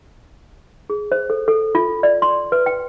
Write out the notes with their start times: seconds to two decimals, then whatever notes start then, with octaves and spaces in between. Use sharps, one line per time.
0.90 G#4
1.12 C5
1.30 A4
1.48 A4
1.75 F4
2.03 D5
2.22 C6
2.52 B4
2.66 G5